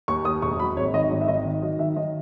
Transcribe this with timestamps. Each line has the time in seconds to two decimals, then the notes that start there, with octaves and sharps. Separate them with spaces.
0.08 D#2 C#6
0.25 D#2 D#6
0.42 E1 C#6
0.59 F#3 B5
0.77 G#1 C#5
0.94 D#3 D#5
1.11 G#1
1.21 E5
1.28 D#3 D#5
1.45 D#3
1.62 F#3 D#5
1.79 D#3 E5
1.96 D#3 D#5